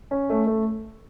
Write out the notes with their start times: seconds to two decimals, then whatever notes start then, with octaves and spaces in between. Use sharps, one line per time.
0.11 C#4
0.30 A3
0.47 A3